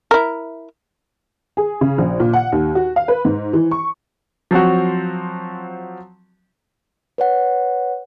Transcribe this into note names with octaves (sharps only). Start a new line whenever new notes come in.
E4 A#4
G#4
C#3
A#1
A#2
F#5
D#2
F#4
F5
B4
G#2
E3
C#6
F3 F#3 C4 F#4
B4 C#5 F#5